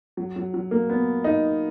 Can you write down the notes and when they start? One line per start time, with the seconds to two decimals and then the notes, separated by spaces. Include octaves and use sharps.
0.17 F#3
0.36 F#3
0.54 F#3
0.71 A#3
0.90 B3
1.24 D#4